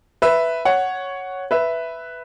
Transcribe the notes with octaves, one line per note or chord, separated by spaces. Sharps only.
B4 E5
C#5 F#5
B4 E5